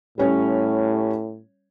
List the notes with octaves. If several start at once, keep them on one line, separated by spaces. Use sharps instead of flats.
A2 G3 C#4 C#5